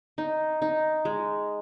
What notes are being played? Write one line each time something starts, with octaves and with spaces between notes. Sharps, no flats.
D#4
D#4
G#3